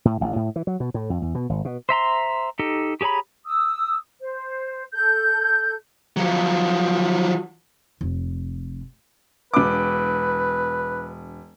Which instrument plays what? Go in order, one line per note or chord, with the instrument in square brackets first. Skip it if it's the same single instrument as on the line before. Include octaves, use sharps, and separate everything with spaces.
[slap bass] A2
A1
A2
E3
F#3
B2
A2
F2
E2
B2
G#1
B2
[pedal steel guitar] C5 E5 A#5 C6
D#4 G4 A4
G4 G#4 C#5 A#5 B5
[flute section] D#6 E6
C5
A4 G6
[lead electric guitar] F3 F#3
[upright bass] F1
[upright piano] E1 D6 [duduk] B4